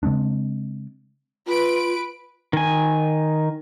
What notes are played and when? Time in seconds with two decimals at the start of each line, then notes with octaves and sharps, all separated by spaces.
0.03 C#3 G#3 C4 D4
1.47 F4 B4 D7
2.53 D#3 G#5